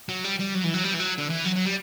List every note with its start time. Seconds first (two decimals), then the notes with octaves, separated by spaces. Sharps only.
0.09 F#3
0.25 G3
0.40 G3
0.55 F#3
0.64 E3
0.74 F#3
0.84 G3
0.94 E3
1.00 F#3
1.18 D3
1.30 E3
1.45 F#3
1.56 F#3
1.66 G3